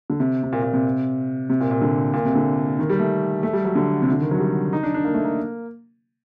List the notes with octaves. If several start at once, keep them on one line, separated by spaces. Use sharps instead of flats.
D3
C3
C3
A#2
A#2
C3
C3
A#2
A#2
D3
A#2
C3
D3
D#3
G3
A3
A3
G3
F#3
D3
C3
D3
D#3
F#3
G3
D#4
D4
D4
A#3
A3
A#3